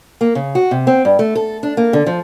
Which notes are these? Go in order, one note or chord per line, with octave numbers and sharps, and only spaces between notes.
A#3
C#3
F#4
C3
C4
G2
A3
A4
D4
A#3
D3
F3